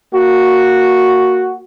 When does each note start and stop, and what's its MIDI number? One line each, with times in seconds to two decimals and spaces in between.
0.14 1.63 58
0.14 1.63 66